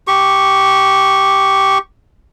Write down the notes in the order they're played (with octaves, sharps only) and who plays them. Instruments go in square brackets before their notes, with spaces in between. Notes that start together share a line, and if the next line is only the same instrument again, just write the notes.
[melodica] G4 C#6